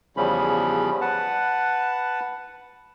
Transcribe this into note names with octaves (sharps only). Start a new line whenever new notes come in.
E2 C#3 F3 G3 C#4 B5
B4 F#5 A5